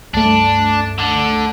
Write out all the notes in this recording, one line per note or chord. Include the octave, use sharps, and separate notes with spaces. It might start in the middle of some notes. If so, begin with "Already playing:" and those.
C#2 G2 A3 D4
D3 D4